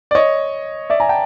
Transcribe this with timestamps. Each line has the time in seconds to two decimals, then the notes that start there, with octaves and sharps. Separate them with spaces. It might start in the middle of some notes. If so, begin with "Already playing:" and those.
0.11 D5
0.15 C#5 D#5
0.90 D5 E5
1.00 G#5 A#5
1.09 G5 A5